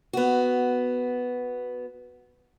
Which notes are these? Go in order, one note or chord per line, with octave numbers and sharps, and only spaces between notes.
B3 F#4